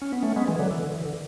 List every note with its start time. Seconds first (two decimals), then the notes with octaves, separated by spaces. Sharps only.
0.02 C#4
0.13 B3
0.23 A3 C#4
0.36 G#3 B3
0.48 E3 G#3
0.59 D3 F#3
0.71 E3
0.83 D3
0.94 E3
1.05 D3